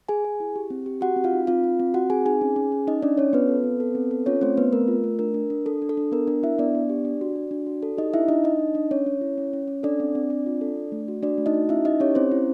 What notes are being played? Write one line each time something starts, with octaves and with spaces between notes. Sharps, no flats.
G#4 G#5
G#4
E4
G4
C4
G4
F#4 G4 F#5
C4
F4 F5
D#4
C4 F4 F5
C4
C4
C4 F#4 F#5
C4 G#4 G#5
D#4 G#4 G#5
C#4
C#4
C#4
C#4 D#4 D#5
C#4 D4 D5
C#4 C#5
B3 F4 B4
A4
C4
A4
C4
A4
C#4 F4 C#5
A3 C4 C5
B3 C4 B4
A3 A#4
F4
A3
D4 A#4
D4
D4
D4 A4
D4
A4
D4
B3 A#4
D4 A#4
D4 E4 E5
B3 D4 D5
B3
G4
D4
F#4
F#4
D4
F#4
A4
D#4 G4 D#5
D4 E4 E5
D4 D#4 D#5
D4 D#4 D#5
D4
D4
C#4 C#5
C#4
E4
C#4
C#4
C#4
D4 A4 D5
C4
C4
C4
F4
A4
D4
A3
F#4
D4 F#4 D5
A3
D#4 D#5
F#4
C#4 E4 E5
D#4 E4 D#5
C#4 G4 C#5
C4 C#4 C5
E4